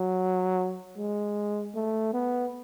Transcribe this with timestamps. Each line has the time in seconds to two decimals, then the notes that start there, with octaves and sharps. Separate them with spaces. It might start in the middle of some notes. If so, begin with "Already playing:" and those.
Already playing: F#3
0.98 G#3
1.75 A3
2.14 B3